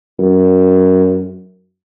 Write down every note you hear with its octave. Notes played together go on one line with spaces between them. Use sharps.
F#2